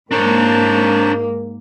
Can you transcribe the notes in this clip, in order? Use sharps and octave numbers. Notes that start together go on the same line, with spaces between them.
G#2 A#3 D4 A#4 C5 C#5 A5 A#5